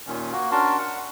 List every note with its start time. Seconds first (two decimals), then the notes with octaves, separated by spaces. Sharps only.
0.07 D#2 A#2 D#3 C#4
0.33 A#3 F#4
0.52 C#4 D4 F#4 A#4 A5 C6
0.79 F#5